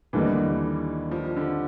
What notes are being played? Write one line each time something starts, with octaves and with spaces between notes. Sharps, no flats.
D#2 D3 E3 G3 A#3 D#4
F3
D3